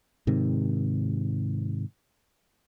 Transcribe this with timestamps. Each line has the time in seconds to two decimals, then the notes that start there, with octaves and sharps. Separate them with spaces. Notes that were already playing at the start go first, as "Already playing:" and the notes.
0.27 G#2 C3 D#3